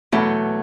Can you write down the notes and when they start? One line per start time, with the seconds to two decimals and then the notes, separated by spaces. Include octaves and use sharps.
0.12 E2 B2 F#3 A3